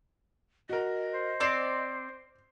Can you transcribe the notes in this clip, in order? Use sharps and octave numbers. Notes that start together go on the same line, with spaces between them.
F#4 A#4 D#5
C5
C4 D5 G6 C7